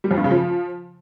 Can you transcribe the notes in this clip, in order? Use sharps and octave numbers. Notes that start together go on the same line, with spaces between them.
G3
F2
G2
C#3
F3